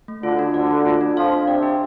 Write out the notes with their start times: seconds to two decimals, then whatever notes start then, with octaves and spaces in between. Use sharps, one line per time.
0.08 A3
0.23 D2 D3 F4
0.39 D4
0.54 D2 D3 D5
0.71 A3
0.86 F4
1.01 D4
1.16 F2 F3 F5
1.32 D4
1.47 C3 C4 D5
1.63 G4